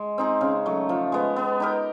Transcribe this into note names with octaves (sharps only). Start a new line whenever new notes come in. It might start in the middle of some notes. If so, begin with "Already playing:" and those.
Already playing: G#3
C4 D#4 G#4
C#3
F#3 A3
F3
G#3 B3
B3
D#4 G4 A#4